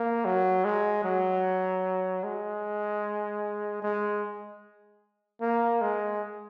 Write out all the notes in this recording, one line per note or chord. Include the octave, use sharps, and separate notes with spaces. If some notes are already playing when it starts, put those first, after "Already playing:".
Already playing: A#3
F#3
G#3
F#3
G#3
G#3
A#3
G#3